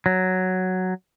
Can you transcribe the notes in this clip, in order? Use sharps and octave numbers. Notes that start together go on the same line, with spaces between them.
F#3